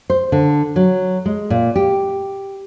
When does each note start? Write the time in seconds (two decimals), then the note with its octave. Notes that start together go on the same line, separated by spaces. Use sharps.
0.10 C5
0.32 D3
0.76 F#3
1.26 G#3
1.50 A#2
1.76 G4